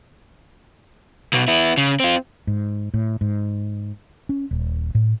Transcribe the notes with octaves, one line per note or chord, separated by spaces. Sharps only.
B1 B2
B3 E4
C#3
C4 F4
G#2
A2
G#2
C#4
D#1
A2